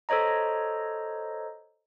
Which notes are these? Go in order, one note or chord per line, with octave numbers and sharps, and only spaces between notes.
A4 C5 C#5 D#5 A#5